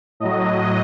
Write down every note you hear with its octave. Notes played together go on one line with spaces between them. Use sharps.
A2 F#3 D#5